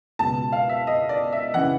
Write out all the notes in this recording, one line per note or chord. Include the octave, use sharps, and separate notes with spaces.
C#2 B2 A5
F5
E5
D#5
D5
E5
C#3 E3 F#5